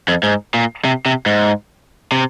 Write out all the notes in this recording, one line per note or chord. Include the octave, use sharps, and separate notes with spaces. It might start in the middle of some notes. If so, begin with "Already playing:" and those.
F2
G#2
A#2
C3
C3
G#2
C3